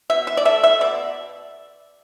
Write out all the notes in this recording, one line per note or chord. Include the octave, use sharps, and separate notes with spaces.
B2 E5
E5
D5
A3 E5
E5
B2 D5